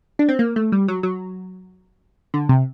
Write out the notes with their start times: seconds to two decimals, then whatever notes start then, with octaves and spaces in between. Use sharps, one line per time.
0.19 D4
0.29 C4
0.39 A#3
0.56 A3
0.72 G3
0.88 F#3
1.03 F#3
2.34 D3
2.49 C3